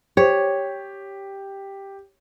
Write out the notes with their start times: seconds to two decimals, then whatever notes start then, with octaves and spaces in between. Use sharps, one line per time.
0.17 G4 C#5